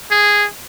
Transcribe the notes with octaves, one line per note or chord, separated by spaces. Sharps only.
G#4